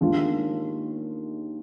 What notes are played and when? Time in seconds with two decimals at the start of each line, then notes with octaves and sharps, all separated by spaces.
0.01 D#2 D#3 G#3 D4 F4